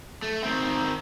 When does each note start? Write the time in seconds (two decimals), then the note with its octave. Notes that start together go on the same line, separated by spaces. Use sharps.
0.22 A3
0.44 D#3 C4